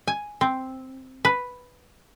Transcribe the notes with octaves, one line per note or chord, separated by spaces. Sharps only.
G#5
C4
B4